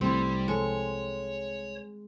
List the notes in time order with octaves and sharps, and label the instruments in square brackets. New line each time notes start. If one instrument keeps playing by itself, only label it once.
[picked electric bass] C2 A3 [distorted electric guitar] G3 [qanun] C4 E4
[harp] G#3 [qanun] A4 [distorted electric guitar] C#5